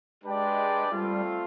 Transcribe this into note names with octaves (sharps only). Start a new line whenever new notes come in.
G#3 D4 G4 B4 D5 G5
G3 A3 C4 F4